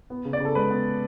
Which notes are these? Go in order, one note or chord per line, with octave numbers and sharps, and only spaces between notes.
B3
C#3
D5
C#3 A4
G#3 B4
B3